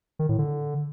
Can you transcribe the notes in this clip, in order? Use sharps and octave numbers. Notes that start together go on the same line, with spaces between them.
D#3
A2
D3